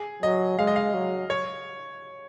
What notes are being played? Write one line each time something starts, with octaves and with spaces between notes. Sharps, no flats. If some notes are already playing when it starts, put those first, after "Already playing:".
Already playing: G#4
F#3 D#5
G#3 F5
D#5
F5
F#3
C#5